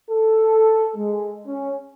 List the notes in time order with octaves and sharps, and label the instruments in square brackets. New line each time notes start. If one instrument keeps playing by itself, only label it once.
[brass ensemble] A4
G#3
C#4